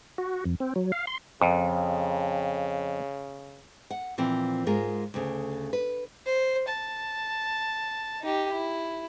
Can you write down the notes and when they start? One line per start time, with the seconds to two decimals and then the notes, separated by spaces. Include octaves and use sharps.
0.18 F#4
0.45 F2
0.60 C4
0.76 F#3
0.92 F5
1.07 C6
1.41 F2 C#3
3.91 F#5
4.18 A#2 E3 F3 C4
4.67 G#2 G#3 F4 A#4
5.14 D2 C#3
5.73 B4
6.26 C5
6.68 A5
8.22 D#4 G4
8.52 E4